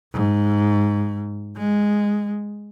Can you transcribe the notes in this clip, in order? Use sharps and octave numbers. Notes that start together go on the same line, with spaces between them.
G#2
G#3